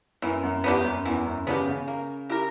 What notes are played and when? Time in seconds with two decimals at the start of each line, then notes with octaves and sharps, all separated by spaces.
0.22 F#2 E3
0.43 F#2
0.64 E2 B3 D4 G4
0.85 F#2
1.05 E2 E3
1.26 F#2
1.47 C#3 B3 D4 G4
1.67 C#3
1.88 A#3
2.29 E4 G4 A#4